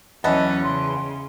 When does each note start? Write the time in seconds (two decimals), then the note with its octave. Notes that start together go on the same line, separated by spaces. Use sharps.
0.24 E2 E3 F#3 C#4 B4 D#5 A5
0.63 C#3 C6